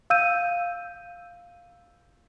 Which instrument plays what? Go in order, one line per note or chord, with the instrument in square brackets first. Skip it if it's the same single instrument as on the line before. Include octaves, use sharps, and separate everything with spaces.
[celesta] F5 E6 G6 D#7